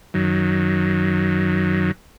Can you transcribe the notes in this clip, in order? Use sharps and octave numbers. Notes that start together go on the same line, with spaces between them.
F#2 D#3 F#3